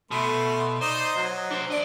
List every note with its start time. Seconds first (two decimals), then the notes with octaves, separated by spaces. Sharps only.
0.11 B2 A3 A4 C6
0.81 D#4 C5 D5 D#5
1.16 F#3
1.51 D4 C5
1.70 D4 D5 D#5